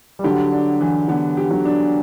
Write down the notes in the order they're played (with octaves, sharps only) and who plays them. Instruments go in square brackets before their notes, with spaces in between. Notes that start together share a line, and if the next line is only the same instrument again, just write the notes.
[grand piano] G3
[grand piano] D3 F#3 [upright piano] G4
[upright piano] D4
E3
[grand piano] D3 [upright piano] B3
[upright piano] G4
[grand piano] D3 F#3
[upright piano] D4